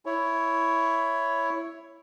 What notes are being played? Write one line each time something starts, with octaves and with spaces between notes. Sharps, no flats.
E4 C#5